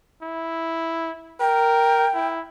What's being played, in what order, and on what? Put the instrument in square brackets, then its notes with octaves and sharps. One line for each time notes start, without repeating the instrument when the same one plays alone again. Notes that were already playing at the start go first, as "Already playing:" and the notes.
[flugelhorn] E4
[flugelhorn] A#4 [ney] G5
[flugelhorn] E4